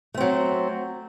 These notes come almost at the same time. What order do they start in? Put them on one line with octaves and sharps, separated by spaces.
A3 C4 F#3